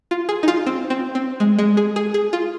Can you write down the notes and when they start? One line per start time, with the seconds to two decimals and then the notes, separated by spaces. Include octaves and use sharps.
0.11 F4
0.29 G#4
0.43 D#4
0.48 F4
0.67 C4
0.90 C4
1.15 C4
1.40 G#3
1.59 G#3
1.77 G#4
1.96 G#4
2.14 G#4
2.33 F4